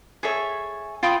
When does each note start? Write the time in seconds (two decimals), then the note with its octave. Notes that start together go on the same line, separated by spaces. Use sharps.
0.23 G#4 A4 C#5 E5
1.03 F4 G5 B5 D#6